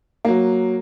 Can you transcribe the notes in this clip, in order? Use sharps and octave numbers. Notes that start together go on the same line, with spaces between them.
F#3 A#3